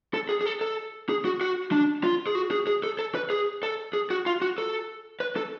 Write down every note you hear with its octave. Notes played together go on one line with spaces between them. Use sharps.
A4
G#4
G#4
A4
A4
G#4
F#4
F#4
D4
F4
G#4
F#4
G#4
G#4
A4
A4
B4
G#4
A4
G#4
F#4
F4
F#4
A4
B4
A4